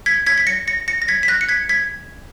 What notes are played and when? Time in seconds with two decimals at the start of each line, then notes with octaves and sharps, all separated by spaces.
0.06 G#6 B6
0.26 G#6 B6
0.38 B6
0.47 A#6 C#7
0.68 A#6 C#7
0.88 A#6 C#7
1.02 A#6
1.08 G#6 B6
1.23 B6
1.28 F#6 A#6
1.41 C#7
1.49 G#6 B6
1.69 G#6 B6